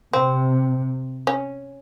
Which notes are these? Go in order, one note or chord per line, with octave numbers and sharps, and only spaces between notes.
C3 C4
C#4